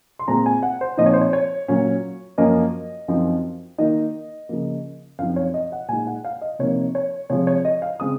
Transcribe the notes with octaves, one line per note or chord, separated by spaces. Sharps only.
C6
A#2 G#3 C4 A#5
G#5
F#5
C5
A#2 F3 C4 D#4 D#5
C#5
C5
C#5
C#5
A#2 F#3 C#4
F#2 F3 A#3 C#4 D#5
F#2 F3 C4 D#4
D#3 A#3 D#4 D#5
C#3 F3 A#3
F#2 F3 C4 D#4 F5
C#5
D#5
F#5
A#2 G#3 D#4 G#5
F#5
F5
D#5
C3 F3 A#3 D#4 C#5
C#5
C3 F3 G#3 C#5
C#5
D#5
F5
C#3 G#3 C4 D#6